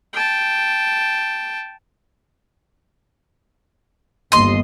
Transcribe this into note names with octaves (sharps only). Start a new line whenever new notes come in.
G5 A5
G1 D#2 D#5 C6